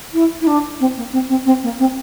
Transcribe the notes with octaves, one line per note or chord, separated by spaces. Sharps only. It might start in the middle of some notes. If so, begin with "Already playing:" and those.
E4
E4
D4
C4
A#3
C4
C4
C4
A#3
C4